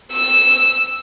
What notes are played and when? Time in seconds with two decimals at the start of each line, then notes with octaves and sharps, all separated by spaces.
0.12 E6